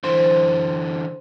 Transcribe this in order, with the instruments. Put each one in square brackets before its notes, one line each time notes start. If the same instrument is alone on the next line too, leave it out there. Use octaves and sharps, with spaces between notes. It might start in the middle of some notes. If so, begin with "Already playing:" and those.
[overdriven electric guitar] D3 E3 [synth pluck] C5